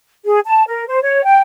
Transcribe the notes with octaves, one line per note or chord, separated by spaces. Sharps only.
G#4
A5
A#4
C5
C#5
G5